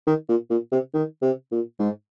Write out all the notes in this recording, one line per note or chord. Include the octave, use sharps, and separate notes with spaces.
D#3
A#2
A#2
C3
D#3
C3
A#2
G#2